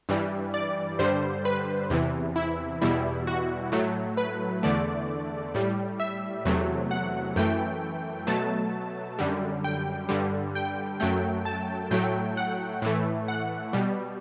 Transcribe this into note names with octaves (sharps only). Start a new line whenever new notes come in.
G2 E3 G3
D5
G2 D3 G3 C5
B4
E2 C3 E3
E4
E2 B2 G3 E4
F#4
A2 F#3 A3
B4
E2 D3 A3 D5
A2 G3
E5
E2 C3 F#3 A3
F#5
F#2 E3 A3 G5
B2 F#3 A3 A5
F#2 D3 G3
G5
G2 D3 G3
G5
F#2 F#3 A3 G5
A5
A2 F#3 A3 G5
F#5
A2 E3 A3
F#5
B2 G3